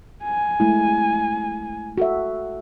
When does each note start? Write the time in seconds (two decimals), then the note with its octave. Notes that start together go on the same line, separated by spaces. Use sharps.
0.23 G#5
0.60 G#3 A3 E4
1.98 F#4 A4 E5